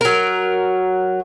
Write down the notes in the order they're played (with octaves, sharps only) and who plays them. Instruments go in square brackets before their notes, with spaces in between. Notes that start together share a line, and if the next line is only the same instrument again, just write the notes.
[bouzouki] F#3 A#4